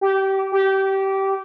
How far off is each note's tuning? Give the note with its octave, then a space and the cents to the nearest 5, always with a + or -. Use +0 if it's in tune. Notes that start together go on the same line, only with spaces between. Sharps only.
G4 -20
G4 -20